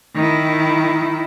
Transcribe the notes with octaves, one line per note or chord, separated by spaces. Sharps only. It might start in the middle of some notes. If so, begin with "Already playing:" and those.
D#3 E4